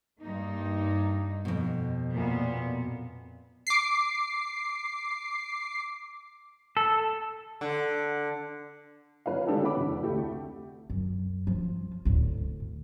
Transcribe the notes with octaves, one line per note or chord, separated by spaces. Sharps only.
G2 A#3 D#4
F2 B2
A#2 B3
D6 C7
A4
D3
F2 B4 C#5 F5
D#3 G#3 C#4 D4 G4 A4
B3 C#4 F#5 B5 D6
F1 E2
D2 A3 G4
F#2
F3 F4
D2 A2